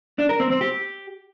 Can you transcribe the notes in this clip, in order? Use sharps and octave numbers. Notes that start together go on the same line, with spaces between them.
D4
A#4
C4
C4
G4